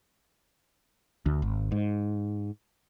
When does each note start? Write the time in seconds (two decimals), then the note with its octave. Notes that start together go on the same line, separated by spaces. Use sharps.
1.26 D2
1.42 G#1
1.72 G#2